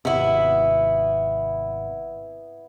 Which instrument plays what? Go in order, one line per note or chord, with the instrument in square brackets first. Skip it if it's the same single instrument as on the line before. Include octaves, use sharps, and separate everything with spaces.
[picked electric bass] G#1 C3 [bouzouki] B3 E4